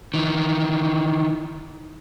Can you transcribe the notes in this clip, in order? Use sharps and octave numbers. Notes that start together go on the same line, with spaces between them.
D#3 E3